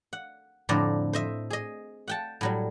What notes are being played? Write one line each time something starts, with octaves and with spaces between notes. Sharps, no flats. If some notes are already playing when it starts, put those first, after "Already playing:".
F#5
F2 A2 D3 C5 D5 A#5
C5 D#5 E5
G#4 D#5
F#5 G5 A5
A2 F#3 G3